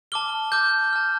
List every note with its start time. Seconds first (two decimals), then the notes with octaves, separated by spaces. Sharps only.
0.12 A5 D6 F6 G7
0.52 A5 D6 F6 G6
0.93 A5 F6